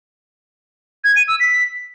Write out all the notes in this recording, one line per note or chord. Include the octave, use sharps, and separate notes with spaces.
G#6
D#7
E6
B6